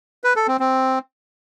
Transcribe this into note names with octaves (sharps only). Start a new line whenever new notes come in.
B4
A4
C4
C4